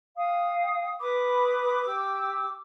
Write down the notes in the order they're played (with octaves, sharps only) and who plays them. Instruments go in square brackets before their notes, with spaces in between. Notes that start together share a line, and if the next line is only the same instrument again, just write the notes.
[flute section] F5 G5 D#6
[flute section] B4 B5 D#6 [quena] D6
[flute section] G4 E6